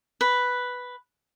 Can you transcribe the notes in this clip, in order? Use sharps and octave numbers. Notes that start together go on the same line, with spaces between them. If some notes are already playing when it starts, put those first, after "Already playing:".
B4